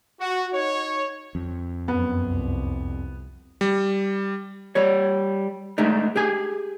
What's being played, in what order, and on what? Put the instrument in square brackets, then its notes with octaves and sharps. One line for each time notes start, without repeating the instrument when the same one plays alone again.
[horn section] F#4
D#4 C#5
[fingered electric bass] F2
[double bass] F#2 [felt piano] B3
[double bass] C2
[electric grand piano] G3
[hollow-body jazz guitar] G3 C#5
G#3 A3 D4 D#4
G4 G#4 G#5